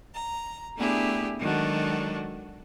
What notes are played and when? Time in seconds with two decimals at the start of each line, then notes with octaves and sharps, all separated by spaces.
0.14 A#5
0.77 A3 B3 D4 E4 G4 G#4
1.40 D#3 F#3 G#3 D4 F#4 A4